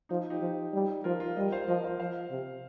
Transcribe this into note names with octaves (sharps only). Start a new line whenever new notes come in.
F3 D#4
D#4 G4
F3
G3
F3 F4 A#4
F4 A#4
G3 A#4 D#5
C5 F5
F3 A#4 D#5
C5 F5
F3 C5 F5
C3